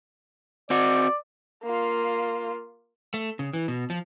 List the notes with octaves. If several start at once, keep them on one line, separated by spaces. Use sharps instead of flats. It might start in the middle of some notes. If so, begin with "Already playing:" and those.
C4 F#4 D5
A#3 F4
A3
C#3
E3
B2
F3